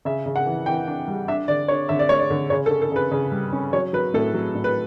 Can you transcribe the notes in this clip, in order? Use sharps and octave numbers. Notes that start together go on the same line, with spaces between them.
C#3 E5
C#3
F#5
E3
E3 G5
D4
G3
D4 E5
D3 D5
D4 C#5
D3 E5
D5
A3 C#5
D5
D3
C#3 C#5
A4
C#4
A4
C#3 B4
C#3
G3
C#4
F#3 C#5
F#3 B4
A2 A4
F#3
A2
B4